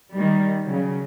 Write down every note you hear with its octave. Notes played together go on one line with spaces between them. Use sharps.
D#3 G3
C#3 F#3